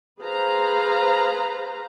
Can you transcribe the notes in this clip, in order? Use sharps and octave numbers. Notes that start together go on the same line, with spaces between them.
G#4 B4 C5 F5 A#5